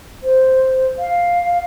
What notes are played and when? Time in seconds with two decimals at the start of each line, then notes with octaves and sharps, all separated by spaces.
0.23 C5
0.99 F5